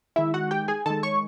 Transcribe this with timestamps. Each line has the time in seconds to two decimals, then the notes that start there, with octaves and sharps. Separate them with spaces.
0.16 D#3 G#3 E4 E5
0.34 F#4 F#5
0.51 G4 G5
0.68 G#4 G#5
0.86 D#3 G#3 A4 A5
1.03 C#5 C#6